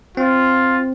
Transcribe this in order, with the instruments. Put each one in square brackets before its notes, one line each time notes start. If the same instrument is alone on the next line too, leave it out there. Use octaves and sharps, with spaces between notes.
[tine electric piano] C4 [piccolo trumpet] F4